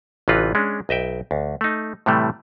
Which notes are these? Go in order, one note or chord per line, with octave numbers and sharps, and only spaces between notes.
A1 C3 E3 D#4 F4 B4
G#3 C#4 D4
B1 D#5 E5 G5
D2
A3 D#4
A2 C3 E3 G3 A3